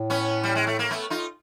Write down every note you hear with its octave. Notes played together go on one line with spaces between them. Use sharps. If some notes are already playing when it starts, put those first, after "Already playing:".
Already playing: A2
B3 C#4
G3
G#3
A3
A#3
A3 B3
D#4 F4